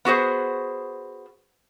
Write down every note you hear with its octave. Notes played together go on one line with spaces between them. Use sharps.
B3 F#4 G#4 C5